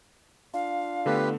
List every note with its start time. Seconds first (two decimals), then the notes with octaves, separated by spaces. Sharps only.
0.54 D4 F4 F5
1.06 D3 A3 B3 G4 B4